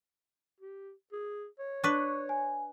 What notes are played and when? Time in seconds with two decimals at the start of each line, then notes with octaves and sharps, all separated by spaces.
0.60 G4
1.12 G#4
1.59 C#5
1.84 D4 B4 C#6
2.29 G#5